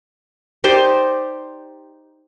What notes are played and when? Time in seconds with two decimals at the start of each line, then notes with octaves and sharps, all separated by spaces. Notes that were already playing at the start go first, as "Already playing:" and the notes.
0.64 D#4 G4 C5 D5